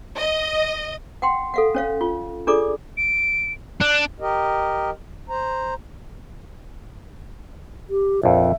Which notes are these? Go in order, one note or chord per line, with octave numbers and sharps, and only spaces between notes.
D#5
F#5 G5 C6
A4 F5 F#5
C#4 C#5 F5
F4
D4 F4 G#4 A4 D5 D6
D7
D4 F#6
G4 A#4 D#5
C5 A#5
G4
A#1 F2 E5